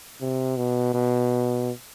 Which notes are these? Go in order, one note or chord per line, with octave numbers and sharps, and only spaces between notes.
C3
B2
B2